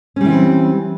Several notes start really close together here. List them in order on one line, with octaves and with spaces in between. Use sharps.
C#4 G3 E3 C4